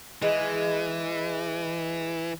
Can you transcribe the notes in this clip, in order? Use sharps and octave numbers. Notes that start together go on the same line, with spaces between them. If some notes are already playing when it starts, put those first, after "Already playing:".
E3 G#3